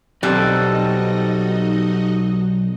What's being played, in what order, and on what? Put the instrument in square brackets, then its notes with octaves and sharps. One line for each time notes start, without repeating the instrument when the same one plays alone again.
[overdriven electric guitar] B1 [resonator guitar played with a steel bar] G3 [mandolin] B3 C4 A4 [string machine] D#4 F#4 D#5